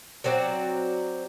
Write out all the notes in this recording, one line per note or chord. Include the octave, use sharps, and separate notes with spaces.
F#3 C4 F#4 D5